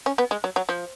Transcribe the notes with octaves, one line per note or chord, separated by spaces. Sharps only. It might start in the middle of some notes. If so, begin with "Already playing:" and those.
C#4
B3
G#3
F#3
F#3
F3